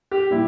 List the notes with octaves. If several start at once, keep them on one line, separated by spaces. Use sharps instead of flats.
G4
A#2 G3 E4